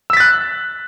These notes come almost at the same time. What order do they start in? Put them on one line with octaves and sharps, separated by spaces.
E6 B6 A6 F#6